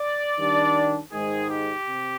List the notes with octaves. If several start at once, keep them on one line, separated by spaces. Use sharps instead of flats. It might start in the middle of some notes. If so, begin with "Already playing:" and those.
Already playing: D5
D#3 G3 D4
G#2 D#3 G#3 G#4
G4
C3